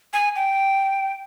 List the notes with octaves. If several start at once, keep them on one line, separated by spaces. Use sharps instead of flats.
G#5
G5